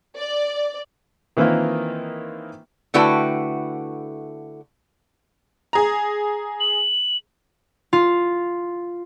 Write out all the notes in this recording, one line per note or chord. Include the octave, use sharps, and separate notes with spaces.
D5
D#3 E3 A#3 C4 E4 F4
D3 A3 E4 F#4 B4 G5
G#4 A#5
F#7
F4